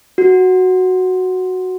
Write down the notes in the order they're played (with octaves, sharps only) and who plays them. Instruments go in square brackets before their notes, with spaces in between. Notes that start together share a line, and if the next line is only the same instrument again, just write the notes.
[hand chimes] F#4